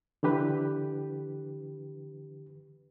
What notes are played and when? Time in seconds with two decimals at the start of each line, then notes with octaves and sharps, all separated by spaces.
0.23 D3 E3 G4 B4